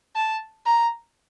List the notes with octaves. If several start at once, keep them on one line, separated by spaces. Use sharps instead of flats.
A5
A#5